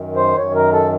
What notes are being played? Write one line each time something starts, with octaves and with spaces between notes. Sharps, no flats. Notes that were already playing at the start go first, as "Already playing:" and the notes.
Already playing: F#2 D#3
C5
F#2 D#3 C#5
A#4
A4